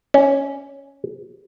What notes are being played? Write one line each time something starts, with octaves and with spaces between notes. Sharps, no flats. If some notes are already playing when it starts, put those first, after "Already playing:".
C#4